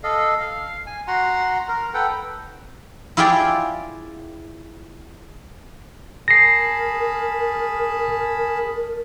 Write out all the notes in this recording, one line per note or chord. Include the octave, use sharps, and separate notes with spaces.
A4 D#5 F5
F5
G#5
F#4 F#5 A#5 C6
A#4 A#5
A4 B4 F#5 G5
E4 F4 G4 G#4 D5 G5
G#4 A#4 A5 B5 A#6 C7